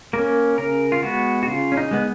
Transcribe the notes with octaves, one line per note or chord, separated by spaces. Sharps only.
A#3 C#4 A#4
C#3 A#4
F4
G#3 B3 F#4
F#4
C#3 F4
C#4
D#4
G#3 B3